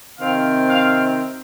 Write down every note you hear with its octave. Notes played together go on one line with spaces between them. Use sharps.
C3 D#3 C4 F5
F5